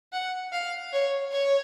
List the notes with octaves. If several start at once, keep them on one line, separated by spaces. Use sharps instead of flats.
F#5
F5
C#5
C#5